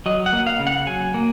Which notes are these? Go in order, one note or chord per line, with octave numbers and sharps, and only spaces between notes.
F#3 D#5
F#5
A#3
F5
C#3
F#5
F#3 G#5
A#3